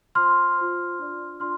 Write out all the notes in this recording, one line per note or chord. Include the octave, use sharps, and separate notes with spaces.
F4 C5 C6 F6
F4 C5
D4 F4 D5
D4 F4 D5 C6 F6